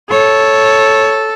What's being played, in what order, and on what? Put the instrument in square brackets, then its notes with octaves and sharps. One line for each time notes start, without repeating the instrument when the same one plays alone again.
[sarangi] A4 [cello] C#5